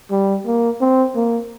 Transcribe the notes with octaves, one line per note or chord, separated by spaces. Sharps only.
G3
A#3
C4
A#3